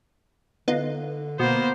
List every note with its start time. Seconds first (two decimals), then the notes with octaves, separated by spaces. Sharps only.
0.68 D3 B3 D#4 F4
1.40 B2 A#3 B3 C5